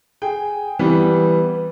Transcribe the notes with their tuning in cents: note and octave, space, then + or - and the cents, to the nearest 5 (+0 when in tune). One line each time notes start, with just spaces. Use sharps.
G#4 +0 G5 +0
E3 +0 G3 +0 B3 +5